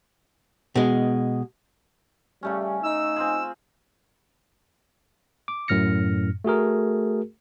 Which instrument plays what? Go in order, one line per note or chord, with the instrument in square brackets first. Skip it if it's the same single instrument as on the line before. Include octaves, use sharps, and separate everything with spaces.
[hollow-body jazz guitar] B2 G#3
[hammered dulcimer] C#3 A3 C#4 [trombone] G3
[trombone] D#4 [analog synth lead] E6
[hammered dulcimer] C4 F4 G#4
[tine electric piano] D6
F#2 A2 F6 A#6 C#7
A3 F#4 G#4 A#4